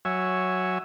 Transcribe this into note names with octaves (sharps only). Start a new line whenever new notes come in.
F#3 C#5 E5 G#5